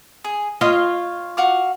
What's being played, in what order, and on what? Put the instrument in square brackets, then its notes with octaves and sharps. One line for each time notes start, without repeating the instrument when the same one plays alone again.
[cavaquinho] G#4
[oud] F4 D#5 [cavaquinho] C#5
[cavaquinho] F#4 F5 D6